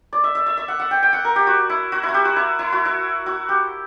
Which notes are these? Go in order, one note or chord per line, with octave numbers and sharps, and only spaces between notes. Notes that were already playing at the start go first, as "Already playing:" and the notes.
D5
E5
E5
E5
E5
F#5
F#5
G5
G5
F#5
A#4
G4
F#4
E4
F#4
E4
F#4
G4
F#4
E4
E4
F#4
E4
F#4
G4